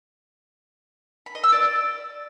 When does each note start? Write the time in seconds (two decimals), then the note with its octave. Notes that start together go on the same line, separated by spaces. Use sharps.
1.26 B5
1.35 D#5
1.44 E6
1.52 D5